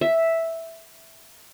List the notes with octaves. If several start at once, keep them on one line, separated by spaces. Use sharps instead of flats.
E5